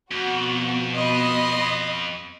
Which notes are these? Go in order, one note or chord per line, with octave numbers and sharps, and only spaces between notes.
F2 B2 F#4
D#5 B5 C6